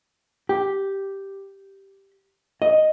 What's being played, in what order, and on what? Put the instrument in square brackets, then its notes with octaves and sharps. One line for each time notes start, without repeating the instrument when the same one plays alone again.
[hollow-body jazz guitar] G4
D#5